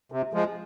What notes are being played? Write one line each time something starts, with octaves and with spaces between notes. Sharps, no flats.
C3
F3 G#3